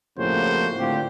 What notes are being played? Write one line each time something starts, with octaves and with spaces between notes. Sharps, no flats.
F2 A2 C#3 A#3 F#4 C5
A2 D3 C4 F4 G4